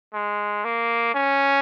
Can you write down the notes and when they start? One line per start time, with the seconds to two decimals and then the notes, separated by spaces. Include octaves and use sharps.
0.14 G#3
0.64 A#3
1.15 C#4